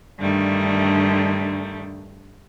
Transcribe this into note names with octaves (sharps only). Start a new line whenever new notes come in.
G2 D3 D#3 G3 A3